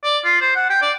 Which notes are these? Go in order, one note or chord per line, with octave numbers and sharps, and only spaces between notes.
D5
F4
C5
F#5
G5
D5